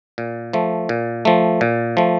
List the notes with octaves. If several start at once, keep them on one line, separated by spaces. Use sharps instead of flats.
A#2
F3 A3
A#2
F3 A3
A#2
F3 A3